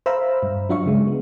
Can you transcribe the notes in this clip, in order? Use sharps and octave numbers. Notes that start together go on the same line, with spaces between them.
C5 E5 F5 A#5 B5 E6
G2
F#3 D4 F4 E5 F5 C#6
C#3 G#3
B3